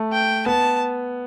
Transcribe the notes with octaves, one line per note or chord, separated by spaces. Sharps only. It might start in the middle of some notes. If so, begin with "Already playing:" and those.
Already playing: A3
G5
B3 A5